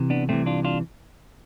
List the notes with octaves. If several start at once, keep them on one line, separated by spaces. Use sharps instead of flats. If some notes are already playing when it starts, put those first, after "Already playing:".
Already playing: C3 E3
B3 D4
C2 C3 E3 A3 C4
D4 F4
D4 F4